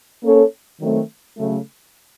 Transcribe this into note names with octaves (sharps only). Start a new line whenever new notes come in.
A#3 C#4 A4 C#5
D#3 F#3 A3 C4
C#3 F#3 A3